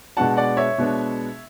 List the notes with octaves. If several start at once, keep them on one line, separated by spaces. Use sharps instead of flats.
B2 G#3 B3 D4 F#5 A5
D5 F#5
C#5 E5
B2 G#3 B3 D4